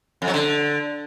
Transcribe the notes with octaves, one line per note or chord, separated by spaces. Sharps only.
F2
F#3
D3